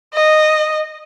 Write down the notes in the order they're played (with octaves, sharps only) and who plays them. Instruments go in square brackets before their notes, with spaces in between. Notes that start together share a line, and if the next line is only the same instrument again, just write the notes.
[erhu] D#5